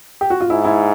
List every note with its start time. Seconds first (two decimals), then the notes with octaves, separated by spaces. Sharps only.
0.21 G4
0.30 F#4
0.41 F4
0.50 G#2 E4
0.65 E4